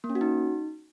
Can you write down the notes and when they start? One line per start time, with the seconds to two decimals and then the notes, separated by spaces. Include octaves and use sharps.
0.04 A#3
0.10 C#4
0.15 F#4
0.21 D#4